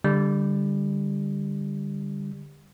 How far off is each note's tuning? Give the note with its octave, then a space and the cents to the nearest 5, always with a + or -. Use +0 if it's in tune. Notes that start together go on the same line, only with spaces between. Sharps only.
D3 +5 G3 +20